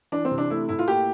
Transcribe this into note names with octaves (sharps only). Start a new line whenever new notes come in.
E3 D4
C4
C3
D4
A3 E4
A2 E4
F4
A#3 G4